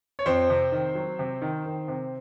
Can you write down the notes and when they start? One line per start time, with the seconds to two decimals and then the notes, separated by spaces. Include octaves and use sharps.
0.19 C#5
0.26 F2 C4 C5
0.50 C3
0.72 D#3
0.95 F#3
1.19 C3
1.42 D#3
1.66 D#3
1.88 C3